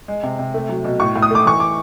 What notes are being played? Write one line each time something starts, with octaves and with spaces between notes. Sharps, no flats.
G#3
C3
C3
A3
F#3
B2
A2 C#6
A2
D#6
A3 D6
E3 C#6
D6